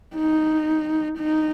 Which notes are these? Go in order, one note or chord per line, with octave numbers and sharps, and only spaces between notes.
D#4
D#4